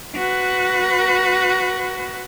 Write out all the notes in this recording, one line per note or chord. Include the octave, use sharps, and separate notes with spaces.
F#4 B4